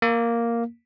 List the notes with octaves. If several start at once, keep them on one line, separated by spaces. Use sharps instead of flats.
A#3